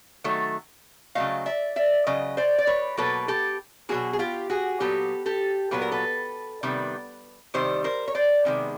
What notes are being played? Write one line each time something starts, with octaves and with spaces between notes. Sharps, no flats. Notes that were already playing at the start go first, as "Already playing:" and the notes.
D#3 F#3 A3
C#3 F#3 A3 D#5 F5
D5 E5
D5 E5
C#3 F#3 D#5
C5 D5
D5
B4 C#5
B2 F#3 A#3 A4 B4
G4 A4
B2 F#3 A#3 F#4 G#4
G#4
F4 G4
F#4 G#4
A#2 F#3 B3 G4 A4
G4 A4
A#2 F#3 B3 B4
A#4
A4 B4
C3 D#3 G3 B3
C3 D#3 G3 C5
A#4 C5
C#5
C5 D5
C3 D#3 G#3 B3